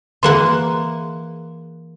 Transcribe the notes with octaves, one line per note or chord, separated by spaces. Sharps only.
E3 A#3 G#4 F#5 C6